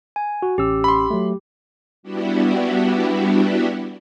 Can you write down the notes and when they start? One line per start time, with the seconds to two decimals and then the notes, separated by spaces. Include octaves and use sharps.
0.16 G#5
0.42 F#4
0.58 A1 C#4 G4 E6
0.84 B5 C6
1.10 F#3 A3
2.03 G3 B3 D4 E4 F#4 G4